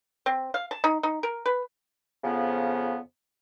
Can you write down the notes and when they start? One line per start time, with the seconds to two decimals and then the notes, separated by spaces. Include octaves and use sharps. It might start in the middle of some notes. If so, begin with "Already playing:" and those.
0.26 C4
0.54 F5
0.71 A5
0.84 D#4
1.03 D#4
1.23 A#4
1.46 B4
2.24 F2 C#3 F3 B3